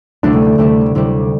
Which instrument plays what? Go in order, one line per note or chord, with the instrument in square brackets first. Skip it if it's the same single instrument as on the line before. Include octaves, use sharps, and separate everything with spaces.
[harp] D2 C3 G3 E4 [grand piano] A3 D4
[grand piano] A3
A3
[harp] D2 C3 G3 E4 [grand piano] A3
[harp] D2 C3 G3 E4